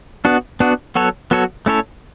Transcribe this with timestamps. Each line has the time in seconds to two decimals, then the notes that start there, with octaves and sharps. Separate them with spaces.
0.25 B3 D4 F#4
0.60 B3 D4 F#4
0.95 F#3 B3 F#4 A4 C#5
1.31 F#3 B3 F#4 A4 C#5
1.66 A3 C#4 E4 A4 C#5